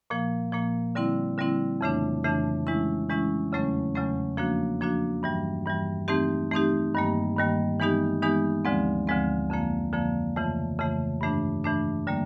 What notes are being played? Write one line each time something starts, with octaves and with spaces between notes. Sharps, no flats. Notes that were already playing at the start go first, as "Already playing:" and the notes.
A#2 F3 A#3
A#2 F3 A#3
D3 G3 C4 E4
D3 G3 C4 E4
F2 C#3 E3 A3 D4
F2 C#3 E3 A3 D4
E3 G#3 C#4 E4
E3 G#3 C#4 E4
E2 C#3 F#3 A3 C#4
E2 C#3 F#3 A3 C#4
F3 A#3 D4 F#4
F3 A#3 D4 F#4
G2 E3 G3
G2 E3 G3
E3 A3 C4 D#4 G4
E3 A3 C4 D#4 G4
G2 D#3 G3 A#3
G2 D#3 G3 A#3
E3 G#3 B3 D#4 G4
E3 G#3 B3 D#4 G4
D2 D3 F3 G#3 C4
D2 D3 F3 G#3 C4
F2 D3 F3 A#3
F2 D3 F3 A#3
F2 C#3 E3 A3
F2 C#3 E3 A3
G2 E3 A3 D4
G2 E3 A3 D4
D3 G3 A#3